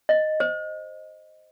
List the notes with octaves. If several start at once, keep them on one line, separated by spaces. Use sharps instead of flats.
D#5
C5